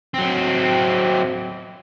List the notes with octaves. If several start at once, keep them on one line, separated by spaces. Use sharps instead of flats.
F#3 C4